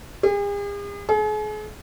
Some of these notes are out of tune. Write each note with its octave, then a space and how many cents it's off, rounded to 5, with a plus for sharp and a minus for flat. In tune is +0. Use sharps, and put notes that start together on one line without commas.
G#4 -45
G#4 +40